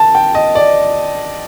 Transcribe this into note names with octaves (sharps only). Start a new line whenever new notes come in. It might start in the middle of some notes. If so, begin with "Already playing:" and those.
Already playing: A5
G5
D#5
D5